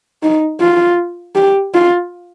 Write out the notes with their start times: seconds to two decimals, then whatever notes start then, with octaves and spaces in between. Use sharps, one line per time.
0.23 D#4
0.61 F4
1.36 G4
1.74 F4